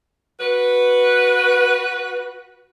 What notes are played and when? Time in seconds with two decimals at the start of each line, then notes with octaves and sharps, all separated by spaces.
0.40 F#4 B4